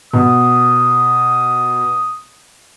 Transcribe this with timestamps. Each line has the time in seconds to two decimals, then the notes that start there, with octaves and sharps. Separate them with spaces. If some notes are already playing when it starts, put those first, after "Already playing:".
0.13 B2 D#6